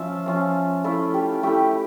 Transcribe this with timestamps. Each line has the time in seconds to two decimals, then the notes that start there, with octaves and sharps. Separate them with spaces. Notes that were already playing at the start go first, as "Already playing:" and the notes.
Already playing: F3 C#4 F4 E5
0.26 F3 C#4 F4
0.84 A3 E4 F4
1.14 G4
1.43 A3 E4 G4